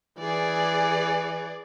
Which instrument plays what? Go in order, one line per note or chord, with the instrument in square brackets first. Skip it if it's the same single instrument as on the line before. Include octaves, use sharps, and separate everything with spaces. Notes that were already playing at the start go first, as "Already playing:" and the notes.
[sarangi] E3 [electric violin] G#4 D5